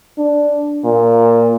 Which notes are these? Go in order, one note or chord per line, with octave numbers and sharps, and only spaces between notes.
D4
A#2